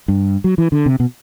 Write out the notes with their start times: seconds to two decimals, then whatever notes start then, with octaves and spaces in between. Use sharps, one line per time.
0.08 G2
0.44 F#3
0.58 E3
0.72 D3
0.86 C3
1.00 B2